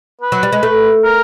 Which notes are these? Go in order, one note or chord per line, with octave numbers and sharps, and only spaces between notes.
B4
F#3
G3
G#3
A3
A#4